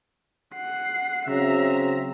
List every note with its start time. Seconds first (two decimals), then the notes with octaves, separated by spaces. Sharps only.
0.56 F#5 C7
1.28 C#3 F#3 C4 E5 A#5